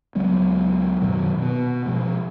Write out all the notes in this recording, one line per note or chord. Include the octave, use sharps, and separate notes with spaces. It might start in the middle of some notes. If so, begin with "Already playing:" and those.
C#2 F#3 G#3 B3
F#2 B2 D#3 F#3
B2 B3
B2 F3 G#3